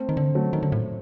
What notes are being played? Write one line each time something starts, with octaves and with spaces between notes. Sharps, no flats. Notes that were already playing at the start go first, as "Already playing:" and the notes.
Already playing: A3 C4
D#3
D3
F#3 A3
D#3
D3
A2